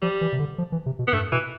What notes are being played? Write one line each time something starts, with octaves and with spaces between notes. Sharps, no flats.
F3 G3
E3
C3
D3
F3
E3
C3
B2
B3
G2 A3
B2 E3